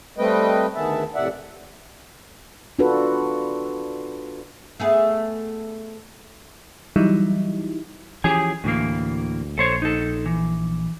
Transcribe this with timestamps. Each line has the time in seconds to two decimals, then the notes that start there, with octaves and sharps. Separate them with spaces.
0.18 G3 A3 C4 B4 D#5 G5
0.75 D2 D#3 B3 G#4 E5 A5
1.15 F2 A2 C3 D5 E5 F#5
2.79 D4 F4 F#4 A4 B4
4.80 A3 B3 G#4
6.96 E3 F#3 G3 D#4 E4
8.24 E3 F3 C#4 G4 G#4 G#5
8.64 D2 A2 E3 A#3
9.58 A#1 A4 C5 C#5
9.82 D#4 A4
10.26 E3